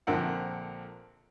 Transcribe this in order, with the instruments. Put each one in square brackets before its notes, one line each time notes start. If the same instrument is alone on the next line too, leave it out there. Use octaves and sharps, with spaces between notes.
[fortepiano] A#1 D3 F3 C4 A#4 F#5